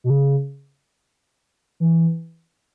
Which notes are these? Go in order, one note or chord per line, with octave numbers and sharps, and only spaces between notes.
B2
C#3
E3